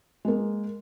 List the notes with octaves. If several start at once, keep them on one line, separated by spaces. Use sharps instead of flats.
G#3 A#3